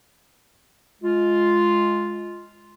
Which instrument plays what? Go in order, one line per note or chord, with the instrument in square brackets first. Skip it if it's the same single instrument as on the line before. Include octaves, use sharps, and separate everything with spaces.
[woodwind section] G#3 F4